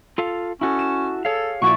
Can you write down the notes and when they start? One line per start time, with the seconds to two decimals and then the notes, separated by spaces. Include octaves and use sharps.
0.18 F4 A4 F5
0.61 C#4 E4 F#4 A4
0.79 E7
1.25 G#4 A4 C#5 F5
1.62 A#2 F3 E4 F#4 D5 E5 C#6